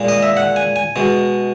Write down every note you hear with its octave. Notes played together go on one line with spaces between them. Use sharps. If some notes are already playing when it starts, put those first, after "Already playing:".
Already playing: A#2 G#3
D#5
E5
F#5
G#5
G#5
B2 G#3